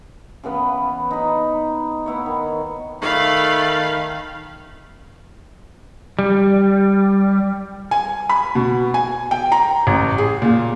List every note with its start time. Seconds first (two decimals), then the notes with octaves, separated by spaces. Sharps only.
0.43 C#3 E3 B3 B4
1.11 D#4 B5
2.06 B3 E4 C#5
2.26 D#3
3.01 D#3 A3 F5 B5
6.19 G3
7.91 G#5
8.29 B5
8.55 B2
8.94 G#5
9.31 G5
9.52 A#5
9.87 A1
10.18 G#4
10.42 A#2